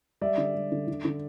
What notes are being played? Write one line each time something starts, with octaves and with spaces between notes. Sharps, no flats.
G3 D5 E5
D3
G3
D3
D3
D3